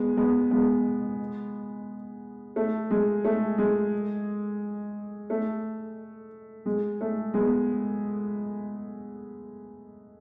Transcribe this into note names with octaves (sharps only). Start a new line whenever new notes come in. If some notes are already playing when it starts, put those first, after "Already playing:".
Already playing: G#3 B3
G#3 B3
G#3 B3
A3
G#3
A3
G#3
A3
G#3
A3
G#3 B3